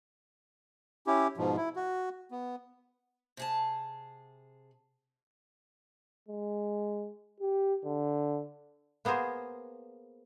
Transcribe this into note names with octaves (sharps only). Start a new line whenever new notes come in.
C#4 E4 G4
G#2 B2 F3
E4
F#4
B3
C3 G#4 A5
G#3
G4
D3
A#3 B3 G#4 A#4 C5